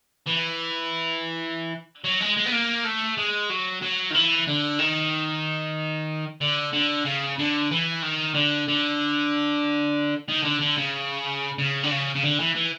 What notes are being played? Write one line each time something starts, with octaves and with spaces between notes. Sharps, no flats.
E3
F#3
G#3
G#3
B3
A#3
A3
G#3
F#3
F#3
D#3
E3
D3
D#3
D3
D3
C#3
D3
E3
D#3
D3
D3
D#3
D3
D3
C#3
C#3
D3
C#3
C#3
D3
E3
E3